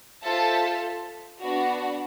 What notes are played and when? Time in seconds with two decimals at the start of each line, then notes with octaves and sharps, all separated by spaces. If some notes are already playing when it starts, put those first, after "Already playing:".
0.24 F4 A4 C5 E5 A5
1.41 B3 D4 F#4